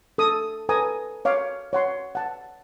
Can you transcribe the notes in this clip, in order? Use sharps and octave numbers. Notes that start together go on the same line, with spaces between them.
A4 D#6
A4 B4 G#5 A#5 D#6
C#5 F5 D6
C#5 F#5 C6
F#5 A5